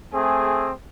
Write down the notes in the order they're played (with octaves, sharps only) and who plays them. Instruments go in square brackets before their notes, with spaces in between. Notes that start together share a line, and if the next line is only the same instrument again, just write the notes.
[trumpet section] A3 C4 G#4